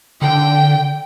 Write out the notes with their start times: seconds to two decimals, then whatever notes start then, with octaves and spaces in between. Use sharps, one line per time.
0.22 D3 G5